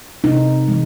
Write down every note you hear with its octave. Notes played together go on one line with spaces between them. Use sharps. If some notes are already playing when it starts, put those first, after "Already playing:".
C3 D#4
E3 G#3